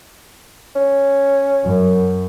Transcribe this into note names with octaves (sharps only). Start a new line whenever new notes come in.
C#4
F#2